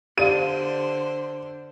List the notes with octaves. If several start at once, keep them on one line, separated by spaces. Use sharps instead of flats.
D3 G4 C5 D5 F5 D#7